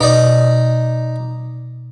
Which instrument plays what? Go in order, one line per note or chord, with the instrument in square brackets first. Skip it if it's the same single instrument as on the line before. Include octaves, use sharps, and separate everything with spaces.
[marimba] B2 [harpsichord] D#4 D5